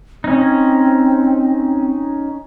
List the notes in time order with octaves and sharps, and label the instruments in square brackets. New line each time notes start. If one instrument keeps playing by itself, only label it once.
[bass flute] C4 [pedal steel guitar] C#4 D#4